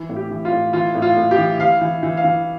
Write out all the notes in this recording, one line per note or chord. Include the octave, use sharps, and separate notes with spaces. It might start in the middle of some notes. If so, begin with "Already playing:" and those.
Already playing: E3
A2
G4
E3
F4
A2
E3 F4
A2
F4
A2
G4
E3
E3 F5
E3
E3
F5
E3